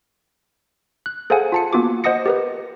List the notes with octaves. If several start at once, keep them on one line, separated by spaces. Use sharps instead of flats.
F#6
G#4 A4 C5 F5 F#5 G#5
F4 A5 C#7
A#3 B3 F4 F#4 D6
C5 D#5 F#5 D#6 A#6 C#7
G4 A#4 B4